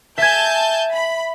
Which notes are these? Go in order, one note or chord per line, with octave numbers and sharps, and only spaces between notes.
E5 G#5 A5 G6 G#6
B5